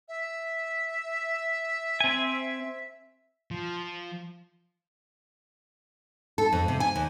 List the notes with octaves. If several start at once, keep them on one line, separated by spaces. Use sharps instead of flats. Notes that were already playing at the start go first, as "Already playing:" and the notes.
E5
C4 G#5
F3
A4
F2
C3
G#5
D#2